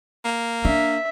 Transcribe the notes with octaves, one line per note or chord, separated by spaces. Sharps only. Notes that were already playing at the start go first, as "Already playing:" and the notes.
A#3
D4 E5